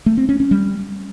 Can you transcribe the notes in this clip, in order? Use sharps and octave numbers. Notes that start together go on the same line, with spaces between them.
A3
C4
C#4
C#4
G3